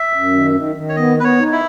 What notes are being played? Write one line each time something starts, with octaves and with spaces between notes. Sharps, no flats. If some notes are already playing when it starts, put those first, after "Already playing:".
Already playing: E5
F#2
D#3
D#3
D#3
C#5
B3 D#5
B3 B4
C#5
D#4
E4